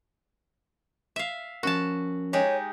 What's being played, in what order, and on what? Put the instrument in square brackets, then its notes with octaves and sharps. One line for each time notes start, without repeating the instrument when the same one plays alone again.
[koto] E5 F5
[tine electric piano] F3 C#4 A#4 [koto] F#4 A5
[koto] G#3 D#4 G4 [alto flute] C#5